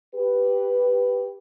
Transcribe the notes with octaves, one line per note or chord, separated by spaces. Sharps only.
G4 B4